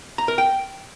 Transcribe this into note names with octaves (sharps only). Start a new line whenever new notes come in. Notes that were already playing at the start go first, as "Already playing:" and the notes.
A#5
A#4
G5